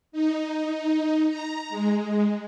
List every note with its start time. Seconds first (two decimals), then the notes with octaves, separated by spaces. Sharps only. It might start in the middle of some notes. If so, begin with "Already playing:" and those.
0.12 D#4
0.73 D#4
1.29 A#5
1.70 G#3